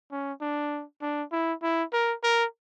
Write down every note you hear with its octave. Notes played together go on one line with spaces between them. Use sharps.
C#4
D4
D4
E4
E4
A#4
A#4